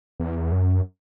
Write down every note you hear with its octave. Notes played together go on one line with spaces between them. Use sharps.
E2
F#2